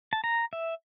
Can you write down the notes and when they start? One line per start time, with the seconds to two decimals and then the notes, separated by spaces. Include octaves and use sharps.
0.13 A5
0.24 A#5
0.53 E5